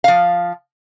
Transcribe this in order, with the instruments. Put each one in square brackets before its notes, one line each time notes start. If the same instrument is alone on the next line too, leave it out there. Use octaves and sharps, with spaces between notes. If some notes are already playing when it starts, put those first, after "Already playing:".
[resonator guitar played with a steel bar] F3 F5